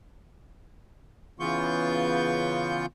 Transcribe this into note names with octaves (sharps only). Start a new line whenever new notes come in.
C#3 E3 B3 F4 C#6 G6